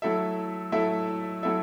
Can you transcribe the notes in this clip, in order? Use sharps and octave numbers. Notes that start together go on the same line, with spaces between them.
F#3 A3 E4 A4 E5
F#3 A3 E4 A4 E5
F#3 A3 E4 A4 E5